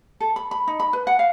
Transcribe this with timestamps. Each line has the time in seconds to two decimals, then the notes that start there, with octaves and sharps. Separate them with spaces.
0.20 A4
0.36 B5
0.51 B5
0.68 D#4
0.80 B5
0.93 B4
1.07 F#5
1.19 F5